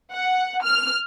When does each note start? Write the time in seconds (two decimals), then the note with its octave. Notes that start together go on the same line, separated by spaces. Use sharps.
0.12 F#5
0.61 F6